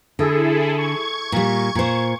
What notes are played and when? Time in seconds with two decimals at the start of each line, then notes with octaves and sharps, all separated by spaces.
0.19 D3 E4 G#4 A4
0.78 C#6 G#6
1.32 A#2 G3
1.75 A#2 C5